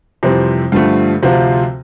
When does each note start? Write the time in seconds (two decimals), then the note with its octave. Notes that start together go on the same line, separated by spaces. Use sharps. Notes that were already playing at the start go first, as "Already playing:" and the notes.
0.23 F2 C3 E3 G3 C4
0.72 G2 D3 F3 A3
1.22 D2 C3 F3 C4 F4